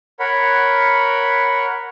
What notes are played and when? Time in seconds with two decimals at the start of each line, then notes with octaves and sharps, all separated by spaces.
0.20 A#4 C#5 F#5 B5